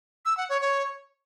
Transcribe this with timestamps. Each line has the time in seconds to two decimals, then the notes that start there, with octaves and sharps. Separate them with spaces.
0.25 E6
0.37 F#5
0.49 C#5
0.61 C#5